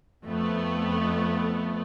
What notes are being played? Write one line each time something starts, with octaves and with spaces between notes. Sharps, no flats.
F2 A3 B3